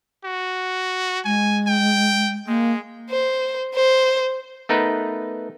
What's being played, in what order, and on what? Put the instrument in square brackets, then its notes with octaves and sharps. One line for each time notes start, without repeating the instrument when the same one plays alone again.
[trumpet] F#4
[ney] G#3 [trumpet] G#5
[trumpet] G5
[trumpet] G#3 [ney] A#3
[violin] C5
C5
[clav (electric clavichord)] A3 B3 D#4 A#4 B4